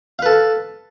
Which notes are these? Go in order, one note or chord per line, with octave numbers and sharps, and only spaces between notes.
A4 B4 F5